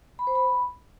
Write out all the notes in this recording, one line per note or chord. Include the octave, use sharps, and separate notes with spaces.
B5
C5
B5